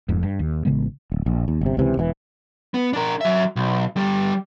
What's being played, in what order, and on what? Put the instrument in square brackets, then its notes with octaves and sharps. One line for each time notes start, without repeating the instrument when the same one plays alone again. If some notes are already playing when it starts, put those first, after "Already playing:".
[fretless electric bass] F1 F2 G#2
G2
D#2
A1 C#3 G#3 B3
D1
A#1
D#2
G1 C3
C#2 C3 E3
E1 B2 E3
[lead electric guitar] B3
D4 A#4
F#3 E5
B1
D3 G3